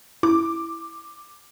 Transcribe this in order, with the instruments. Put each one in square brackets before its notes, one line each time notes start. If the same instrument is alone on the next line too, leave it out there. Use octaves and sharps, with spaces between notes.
[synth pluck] E4 [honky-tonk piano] D6